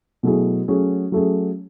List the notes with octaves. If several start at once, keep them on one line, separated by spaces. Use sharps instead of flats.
B2 F#3 A3 E4 G#4
F#3 A3 C#4 G#4
F#3 A3 C#4 G#4